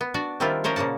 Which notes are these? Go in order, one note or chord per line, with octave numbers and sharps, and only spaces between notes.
B3
D4 F#4 D5
D#3 G3 C4 D4 E4 F4
F3 C#4 A#4 C5 C#5
A#2 C#3 A#3 F#5 A5